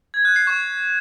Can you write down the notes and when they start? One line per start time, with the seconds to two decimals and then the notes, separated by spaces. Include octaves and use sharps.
0.14 G#6
0.25 F#6
0.36 C7
0.47 C#6